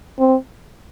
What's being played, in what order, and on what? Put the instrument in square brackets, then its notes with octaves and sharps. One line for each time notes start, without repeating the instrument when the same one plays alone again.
[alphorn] C4